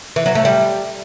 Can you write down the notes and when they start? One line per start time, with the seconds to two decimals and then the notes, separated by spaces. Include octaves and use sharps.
0.16 E3
0.26 F#3
0.35 A3
0.45 G3